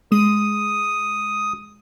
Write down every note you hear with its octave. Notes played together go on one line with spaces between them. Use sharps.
G#3 D#6 D#7